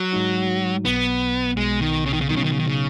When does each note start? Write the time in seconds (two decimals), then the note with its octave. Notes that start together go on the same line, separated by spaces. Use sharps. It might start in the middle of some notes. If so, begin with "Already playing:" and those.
Already playing: F#3
0.13 G#2 G#3 D#4 F#4
0.84 B1 B2 F#3 B3
1.57 B1 B2 G#3 B3
1.81 D#3
2.06 C#3
2.13 D#3
2.21 C#3
2.29 B2 D#3 F#3 B3 D#4
2.36 C#3
2.44 D#3
2.52 C#3
2.60 D#3
2.67 C#3